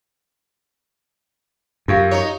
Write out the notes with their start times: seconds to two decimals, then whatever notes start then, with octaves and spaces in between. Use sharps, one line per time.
1.88 F#2 F4 G4 F5
2.11 D#4 C#5